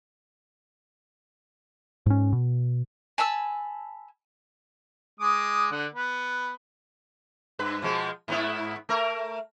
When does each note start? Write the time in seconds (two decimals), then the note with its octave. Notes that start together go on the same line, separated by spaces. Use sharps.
2.06 G#2 C#4
2.33 B2
3.18 G#5 A5 B5 E6
5.20 G#3 D6 D#6
5.72 D3 F#5
5.95 B3
7.59 G2 B4
7.82 B2 F3 G#3
8.28 G#2 B3 E4
8.89 A3 A#4